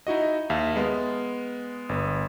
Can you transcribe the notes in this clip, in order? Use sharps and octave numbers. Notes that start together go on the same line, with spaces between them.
D#4 E4 F#4 D#5
D#2 E5 F5 F6
G#3 B3
G1 B3